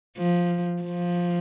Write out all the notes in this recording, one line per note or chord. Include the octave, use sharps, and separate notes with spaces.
F3
F3